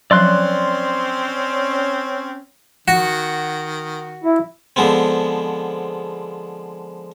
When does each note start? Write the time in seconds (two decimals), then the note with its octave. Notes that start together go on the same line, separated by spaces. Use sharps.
0.11 F3 F#3 C4 C#4 D5 C6 F#6
2.88 D#3 F#4
4.24 E4
4.76 D3 F3 G#3 B3 C4